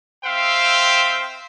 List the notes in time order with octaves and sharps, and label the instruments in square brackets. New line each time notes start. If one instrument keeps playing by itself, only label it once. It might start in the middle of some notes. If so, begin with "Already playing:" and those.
[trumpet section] C4 C5 E5 F5 G5